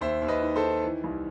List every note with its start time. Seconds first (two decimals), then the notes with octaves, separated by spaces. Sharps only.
0.01 D#2 C5 E5
0.22 D#2
0.28 B4 D#5
0.42 D#3
0.56 A4 C5
0.63 D#3
0.84 E3
1.04 C2